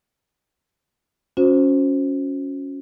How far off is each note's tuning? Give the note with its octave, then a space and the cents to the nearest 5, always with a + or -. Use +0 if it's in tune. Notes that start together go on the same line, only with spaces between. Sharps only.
C#4 +0 F#4 -35 C5 +0